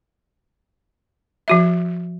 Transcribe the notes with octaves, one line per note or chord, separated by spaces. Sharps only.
F3 F#4 E5